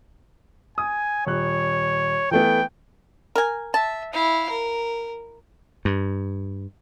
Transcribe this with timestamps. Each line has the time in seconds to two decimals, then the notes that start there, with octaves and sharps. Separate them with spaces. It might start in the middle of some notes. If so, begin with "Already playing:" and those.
0.78 G#5 D#6
1.27 D#1 C#5 F#6
2.31 E3 A3 B3 G5
3.36 A#4 G#5
3.74 E5 A5
4.13 E4 F5
4.50 A#4
5.85 G2